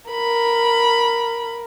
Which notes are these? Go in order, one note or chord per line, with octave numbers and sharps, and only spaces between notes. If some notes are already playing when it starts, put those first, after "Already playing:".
A#4 B5